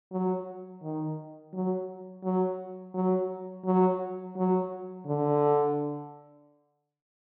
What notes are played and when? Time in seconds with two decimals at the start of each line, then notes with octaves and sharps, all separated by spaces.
0.12 F#3
0.82 D#3
1.53 F#3
2.23 F#3
2.94 F#3
3.65 F#3
4.36 F#3
5.06 D3